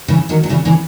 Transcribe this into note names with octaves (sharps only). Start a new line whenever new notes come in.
C#3 E3
D#3 F#3
F#3
C#3 E3
C#3 E3